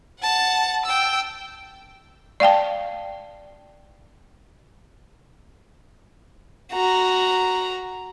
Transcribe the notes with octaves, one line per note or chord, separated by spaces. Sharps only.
F#5 A5
G5 E6
D5 F5 G5 A5
F#4 A#5